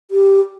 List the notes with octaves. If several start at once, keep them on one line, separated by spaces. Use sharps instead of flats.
G4